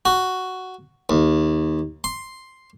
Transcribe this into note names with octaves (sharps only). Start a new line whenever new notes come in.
F#4
D#2
C6